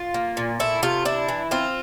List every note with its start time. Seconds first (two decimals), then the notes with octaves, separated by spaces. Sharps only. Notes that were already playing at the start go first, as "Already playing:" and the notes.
Already playing: F4
0.14 A#3
0.37 A#2
0.60 A3 E4
0.82 C3 F4
1.05 D4 E4
1.29 E3
1.51 C4 F4